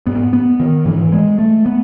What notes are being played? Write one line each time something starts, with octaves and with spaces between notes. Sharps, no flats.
G#2 B3
B3
D#3
G#2 E3
G#3
A3
B3